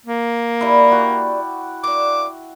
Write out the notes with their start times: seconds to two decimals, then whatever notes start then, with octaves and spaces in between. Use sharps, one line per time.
0.06 A#3
0.61 D3 G3 E4
0.92 F#4 D5 G5
1.84 A#3 D4 D6